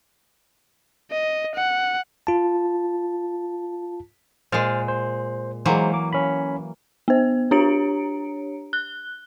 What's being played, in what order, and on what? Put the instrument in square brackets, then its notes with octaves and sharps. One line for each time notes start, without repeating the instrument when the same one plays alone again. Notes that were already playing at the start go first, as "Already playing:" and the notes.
[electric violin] D#5
F#5
[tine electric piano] F4 A5
[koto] A#2 G#3 [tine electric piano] C5 F6 A6
[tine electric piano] C5
[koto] E3 F#3 A#3 [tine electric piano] G#3 C5
[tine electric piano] D6
C#4 B5
[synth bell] B3 C5
D4 G4 C#5 A#5 C#7 D7
F#6 G7